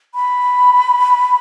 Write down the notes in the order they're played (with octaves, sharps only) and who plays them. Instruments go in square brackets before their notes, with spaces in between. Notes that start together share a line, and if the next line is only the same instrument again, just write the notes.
[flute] B5